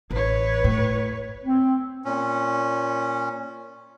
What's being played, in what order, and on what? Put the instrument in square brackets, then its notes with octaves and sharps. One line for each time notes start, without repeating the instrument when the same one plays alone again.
[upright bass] A1 [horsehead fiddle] B4 C#5
[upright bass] A2
[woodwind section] C4
[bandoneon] A#2 C#4